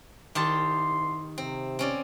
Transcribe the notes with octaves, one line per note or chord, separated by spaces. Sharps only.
C2 D#3 G4 A5 C6
C3 C4
C4 C#4 D5